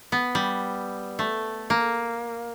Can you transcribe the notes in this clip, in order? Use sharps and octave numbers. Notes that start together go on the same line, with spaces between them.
B3
G3
A3
A#3